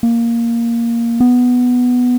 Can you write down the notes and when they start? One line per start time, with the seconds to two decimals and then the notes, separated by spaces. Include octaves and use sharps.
0.03 A#3
1.20 B3